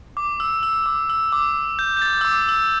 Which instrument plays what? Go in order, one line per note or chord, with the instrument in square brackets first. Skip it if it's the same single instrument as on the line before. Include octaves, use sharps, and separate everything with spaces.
[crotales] D6
E6
E6
D6
E6
D6
G6
G6
A6
E6
D6
E6